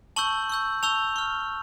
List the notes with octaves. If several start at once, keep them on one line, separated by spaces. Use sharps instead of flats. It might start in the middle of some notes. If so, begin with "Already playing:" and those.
A5 C#6 E6 G6 F#7
C#6 E6 G6
A5 C#6 E6 G6 F7
C#6 F6